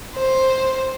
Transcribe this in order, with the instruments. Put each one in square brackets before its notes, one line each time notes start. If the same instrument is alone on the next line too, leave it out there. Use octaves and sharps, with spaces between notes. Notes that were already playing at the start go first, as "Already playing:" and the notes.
[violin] C5